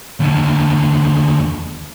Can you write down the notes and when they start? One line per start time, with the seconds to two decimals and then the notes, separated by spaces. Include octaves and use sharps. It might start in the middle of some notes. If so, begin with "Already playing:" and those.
0.20 D#2 D3